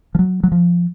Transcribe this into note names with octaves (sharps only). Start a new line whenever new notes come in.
F3
F#3
F#3
F3